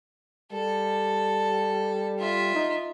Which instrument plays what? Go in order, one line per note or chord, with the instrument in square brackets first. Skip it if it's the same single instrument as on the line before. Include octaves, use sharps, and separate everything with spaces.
[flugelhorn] G3 [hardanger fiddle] A4
[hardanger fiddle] F4 E5
[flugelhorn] D#4